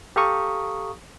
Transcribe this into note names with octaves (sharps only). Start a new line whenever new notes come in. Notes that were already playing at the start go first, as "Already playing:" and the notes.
G4 A4 F5 A#5 C#6 D#6